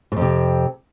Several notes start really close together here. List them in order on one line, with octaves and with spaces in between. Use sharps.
G#2 F2 C3